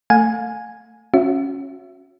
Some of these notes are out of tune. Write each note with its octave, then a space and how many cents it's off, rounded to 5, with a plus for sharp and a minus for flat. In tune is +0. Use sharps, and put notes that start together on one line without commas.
A3 +25 F5 +40 G#5 +0
C#4 -10 F#4 -25 E5 +20